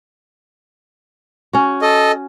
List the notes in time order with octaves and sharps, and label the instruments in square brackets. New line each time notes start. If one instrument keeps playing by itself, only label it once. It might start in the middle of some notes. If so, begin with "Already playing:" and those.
[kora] C#4 F#4
[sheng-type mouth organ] A4 D#5